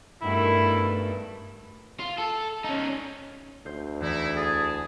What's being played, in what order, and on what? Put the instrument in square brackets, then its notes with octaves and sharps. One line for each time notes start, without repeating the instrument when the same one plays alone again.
[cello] G2 A3 [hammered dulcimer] B2 D#3 B3 [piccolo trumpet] E4
[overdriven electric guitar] F4
A4
C#4 D#4
[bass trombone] D2 [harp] C5 G6
[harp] E2 [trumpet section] D#4 E4
[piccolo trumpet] G#4 [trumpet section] A5